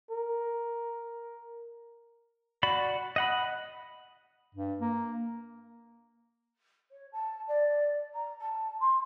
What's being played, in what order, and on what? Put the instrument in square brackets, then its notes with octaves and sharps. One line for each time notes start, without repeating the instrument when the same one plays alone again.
[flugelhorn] A#4
[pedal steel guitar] F#4 D5 B5
D#5 F#5 B5
[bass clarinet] G2
A#3
[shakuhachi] C#5
A5
D5
A#5
A5
C6